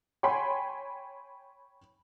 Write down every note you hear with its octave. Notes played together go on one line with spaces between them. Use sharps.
C#5 G5 G#5 B5 C6